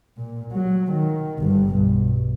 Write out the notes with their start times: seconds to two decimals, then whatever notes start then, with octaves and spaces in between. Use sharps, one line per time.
0.17 A#2
0.53 F#3
0.92 D#3
1.39 G1 G2
1.75 B1